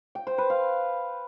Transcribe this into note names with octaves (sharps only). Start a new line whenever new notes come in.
G5
C5
B4
F5